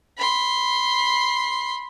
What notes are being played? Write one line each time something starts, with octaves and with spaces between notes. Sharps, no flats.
B5 C6